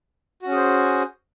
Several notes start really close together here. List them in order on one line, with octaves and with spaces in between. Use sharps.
F#4 C#4 G#4 C5